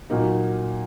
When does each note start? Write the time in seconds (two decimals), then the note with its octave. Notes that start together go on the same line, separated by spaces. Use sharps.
0.10 A#2 F#3 A#3 D#4